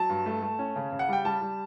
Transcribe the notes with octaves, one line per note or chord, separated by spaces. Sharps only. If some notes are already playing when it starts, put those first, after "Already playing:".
Already playing: F#3 A5
G2
A3
A3
C#4
C#3
C#3
F#5
G3 G5
G3 A5
G3